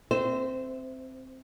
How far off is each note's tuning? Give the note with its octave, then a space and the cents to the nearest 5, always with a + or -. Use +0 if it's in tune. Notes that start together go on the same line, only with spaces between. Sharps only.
C4 +0 C5 -20 E5 +0